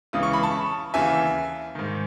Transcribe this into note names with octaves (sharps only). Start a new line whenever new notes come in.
C#2 C#3 E3 D#6
C#6
B5
A5 C#6
D#2 C#3 E3 E5 G#5
G#2 D#3